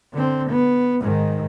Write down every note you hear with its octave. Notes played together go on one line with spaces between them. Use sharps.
D3 C4
B3
G#2 D#3